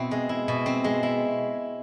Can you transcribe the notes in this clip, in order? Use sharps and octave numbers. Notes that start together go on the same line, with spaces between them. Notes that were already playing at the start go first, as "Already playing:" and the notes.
Already playing: B2 C4 E4
G#3
E4
B2
C4
G#3
E4